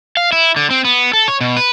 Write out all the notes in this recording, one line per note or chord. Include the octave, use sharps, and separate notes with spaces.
F5
E4
D3
C4
B3
A4
C#5
B2
B4